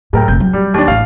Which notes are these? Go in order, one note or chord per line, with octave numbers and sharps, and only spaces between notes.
F#1 A2 A#4 G5
F1 A#1 G6
F#3
G3
D#2 D4
A1 F5